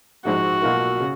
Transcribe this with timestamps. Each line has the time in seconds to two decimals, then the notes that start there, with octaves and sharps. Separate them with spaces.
0.25 A#1 G#2 F3 G#3 D#4 F#4
0.62 B1 B2 A#3 F4 A#4
1.00 C#3